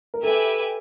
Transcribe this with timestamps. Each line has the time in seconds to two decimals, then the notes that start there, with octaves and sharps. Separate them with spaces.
0.14 A#4
0.23 G4 A4 B4 E5 G#5